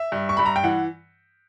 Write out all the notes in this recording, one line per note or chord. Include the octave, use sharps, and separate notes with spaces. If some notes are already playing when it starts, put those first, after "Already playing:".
Already playing: E5
G2
C#6
G2 B5
A#5
G5
E3 F#5